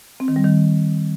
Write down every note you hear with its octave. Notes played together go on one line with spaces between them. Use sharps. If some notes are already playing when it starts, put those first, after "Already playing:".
C4
D#3
G3
D#3